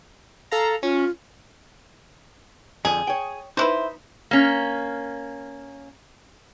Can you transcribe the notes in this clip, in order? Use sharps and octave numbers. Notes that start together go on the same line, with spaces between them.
A4 F5 A#5
C#4 F4
F2 D3 F3 G#4
C#5 G5
D#4 E4 B4 C5
A#3 C#4